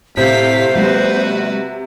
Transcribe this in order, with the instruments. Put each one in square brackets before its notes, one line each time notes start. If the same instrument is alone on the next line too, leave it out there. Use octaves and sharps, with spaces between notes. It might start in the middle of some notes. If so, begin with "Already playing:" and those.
[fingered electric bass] A2 A3 [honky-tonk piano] C3 [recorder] C5 [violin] F5 B6
[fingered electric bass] F#3 G#3 [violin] F#4 B4